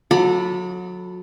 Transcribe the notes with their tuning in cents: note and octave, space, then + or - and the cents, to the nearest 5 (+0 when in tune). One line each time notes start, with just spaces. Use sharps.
F#3 -30 A4 -10 B5 +0